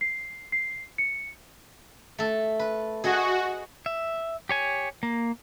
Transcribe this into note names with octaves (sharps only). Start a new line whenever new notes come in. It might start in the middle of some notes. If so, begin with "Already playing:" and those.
C7
C7
C#7
A3 A4
B4
F#4 G#4 D#5 G#5
E5
G4 C#5 G#5
A#3